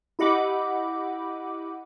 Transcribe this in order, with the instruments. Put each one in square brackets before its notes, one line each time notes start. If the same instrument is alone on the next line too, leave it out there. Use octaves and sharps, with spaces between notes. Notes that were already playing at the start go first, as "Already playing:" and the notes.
[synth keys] E4 G4 D#5 F#5 B5 D6